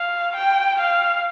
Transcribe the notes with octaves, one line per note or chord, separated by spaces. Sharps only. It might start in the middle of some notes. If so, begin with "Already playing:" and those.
Already playing: F5
G5
F5